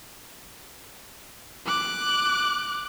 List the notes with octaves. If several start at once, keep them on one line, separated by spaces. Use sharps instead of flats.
D6 F#6